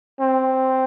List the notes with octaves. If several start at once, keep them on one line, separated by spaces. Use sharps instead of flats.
C4